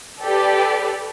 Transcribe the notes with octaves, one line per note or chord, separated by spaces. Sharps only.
G4 A4 B4 D5